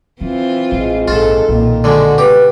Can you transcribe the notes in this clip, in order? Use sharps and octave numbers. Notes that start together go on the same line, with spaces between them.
E3 F3 C4 F4
A1 G#3
A#1 G#2 F4 A4
B1 A#2 D#3
D3 G#3 F#4
C#3 G4 B4